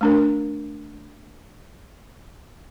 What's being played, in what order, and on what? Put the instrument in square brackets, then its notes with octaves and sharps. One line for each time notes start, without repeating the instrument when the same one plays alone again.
[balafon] A3 D4 A#4